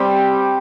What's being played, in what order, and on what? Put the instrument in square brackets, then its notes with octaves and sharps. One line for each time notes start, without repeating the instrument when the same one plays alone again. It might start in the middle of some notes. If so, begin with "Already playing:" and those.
Already playing: [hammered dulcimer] G3 C4 G4